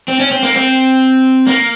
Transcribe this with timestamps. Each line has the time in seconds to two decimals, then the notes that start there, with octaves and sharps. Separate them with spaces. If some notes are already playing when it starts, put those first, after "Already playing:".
0.08 C4
0.20 C#4
0.31 C4
0.43 A#3
0.55 C4
1.47 A#3